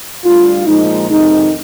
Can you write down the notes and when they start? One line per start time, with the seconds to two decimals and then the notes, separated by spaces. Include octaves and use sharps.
0.24 D2 D3 G3 F4
0.66 A#2 F3 G#3 D#4
1.09 F2 C3 D#3 G#3 D#4